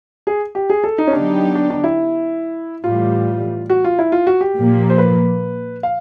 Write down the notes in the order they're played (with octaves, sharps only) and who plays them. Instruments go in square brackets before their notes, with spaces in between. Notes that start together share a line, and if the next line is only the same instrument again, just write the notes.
[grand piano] G#4
G4
G#4
A4
D#4
C#4
[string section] D3 F#3 B3 D#4 G4 [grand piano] D4
[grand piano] D4
D4
E4
[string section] A2 E3 G3 [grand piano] F4
[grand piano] F#4
F4
E4
F4
F#4
G4
[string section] A#2 F3 A#3
[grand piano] C5
B4
F5